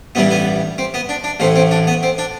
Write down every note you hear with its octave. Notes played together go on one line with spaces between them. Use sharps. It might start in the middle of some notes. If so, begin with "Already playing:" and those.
A1 G2 E3 G3 B3
B3
C4
B3
D4
D4
A1 A2 E3 C4
C4
D4
B3
C4
D4